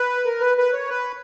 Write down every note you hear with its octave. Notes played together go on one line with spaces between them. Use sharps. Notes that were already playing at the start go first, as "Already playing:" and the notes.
Already playing: B4
A#4
B4
B4
C#5
B4